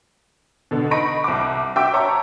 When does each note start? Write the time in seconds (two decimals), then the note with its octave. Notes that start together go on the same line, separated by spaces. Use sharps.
0.71 B2 D3
0.91 D#4 B5 C#6 A#6 D7
1.24 C2 D6
1.76 F#4 E5 G5 D6 E6
1.93 C#5 A5 A#5 C#6